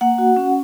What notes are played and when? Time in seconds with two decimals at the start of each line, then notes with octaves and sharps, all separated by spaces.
0.01 A#3 F#5
0.18 F#4
0.36 C#4